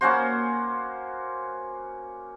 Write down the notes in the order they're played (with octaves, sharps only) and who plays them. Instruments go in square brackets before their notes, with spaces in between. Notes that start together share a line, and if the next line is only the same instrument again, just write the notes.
[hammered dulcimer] A#3 C#4 F#4 C5